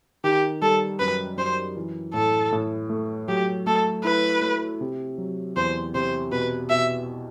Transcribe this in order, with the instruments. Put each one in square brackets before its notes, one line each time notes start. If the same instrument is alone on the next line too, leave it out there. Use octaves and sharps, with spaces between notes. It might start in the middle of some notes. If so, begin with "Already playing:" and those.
[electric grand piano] D#3 [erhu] G4
[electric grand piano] G3 [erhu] A4
[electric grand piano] F#2 [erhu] B4
[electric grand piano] F#2 [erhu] C5
[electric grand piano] E3
[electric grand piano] A2 [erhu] A4
[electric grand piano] A2
A3
[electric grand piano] F#3 [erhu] G4
[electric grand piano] A3 [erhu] A4
[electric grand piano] E4 [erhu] B4
[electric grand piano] A3
C3
F#3
[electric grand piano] E2 [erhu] C5
[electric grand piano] C3 [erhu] C5
[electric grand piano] B2 [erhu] B4
[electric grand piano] B2 [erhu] E5